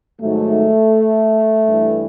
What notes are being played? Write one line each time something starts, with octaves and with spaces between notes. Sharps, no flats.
G#2 D#3 F#3 A3
G2 E3